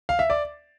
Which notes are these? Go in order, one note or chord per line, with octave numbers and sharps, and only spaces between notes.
F5
E5
D5